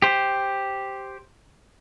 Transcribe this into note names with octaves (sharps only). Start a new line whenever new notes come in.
G4 C5